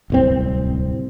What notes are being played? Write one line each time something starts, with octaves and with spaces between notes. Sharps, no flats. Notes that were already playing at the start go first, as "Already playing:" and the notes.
D1 C2 C4